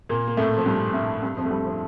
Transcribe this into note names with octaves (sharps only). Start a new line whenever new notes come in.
A#2 A#3
A#3
A2 A3
F3
G2 G3
A2 A3
G2 G3
F2 F3
A3
G2 G3
F3